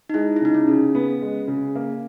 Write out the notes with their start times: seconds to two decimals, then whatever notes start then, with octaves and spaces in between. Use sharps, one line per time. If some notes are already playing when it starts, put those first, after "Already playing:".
0.10 D#4
0.14 G#3 E4
0.36 E4
0.41 C#3 D#4
0.55 C#4
0.68 C#3
0.95 B3
1.22 G#3
1.48 C#3
1.75 A#3